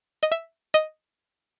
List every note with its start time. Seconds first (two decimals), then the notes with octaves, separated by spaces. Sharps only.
0.23 D#5
0.32 E5
0.74 D#5